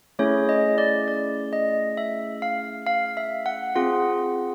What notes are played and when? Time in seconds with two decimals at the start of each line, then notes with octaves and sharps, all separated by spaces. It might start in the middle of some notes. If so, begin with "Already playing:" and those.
0.19 A3 C#4 E4 G#4 C#5
0.49 D#5
0.78 D5
1.08 D5
1.53 D#5
1.97 E5
2.42 F5
2.87 F5
3.17 E5
3.46 F#5
3.76 C4 F4 G#4 F#5